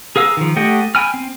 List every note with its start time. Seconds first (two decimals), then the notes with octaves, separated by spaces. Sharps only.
0.16 G#4 A#4 F5 E6
0.37 D#3 F3
0.56 A3 G4 D#5 F#5 G5
0.95 G5 G#5 B5 F6
1.14 C4